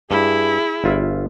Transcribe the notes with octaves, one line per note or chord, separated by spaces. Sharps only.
G2 E4 G#4
G1 F4 E5